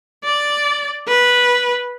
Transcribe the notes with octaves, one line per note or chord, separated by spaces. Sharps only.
D5
B4